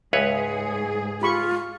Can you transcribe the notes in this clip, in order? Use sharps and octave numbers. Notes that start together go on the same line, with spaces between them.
C#2 G#2 G#4 B4 C#5 E5
F4 G4 B5 C#6